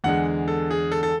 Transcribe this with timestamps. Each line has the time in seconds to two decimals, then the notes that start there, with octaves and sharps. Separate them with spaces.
0.04 E2 D3 G#3 F#5
0.48 A4
0.70 G#4
0.92 A4
1.03 A4